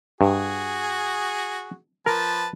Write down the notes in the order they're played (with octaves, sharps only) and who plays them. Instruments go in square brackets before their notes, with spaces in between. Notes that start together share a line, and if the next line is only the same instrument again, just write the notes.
[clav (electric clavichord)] G2 [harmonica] F#4 G#4
[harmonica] F3 B4 A5 [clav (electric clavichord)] A#4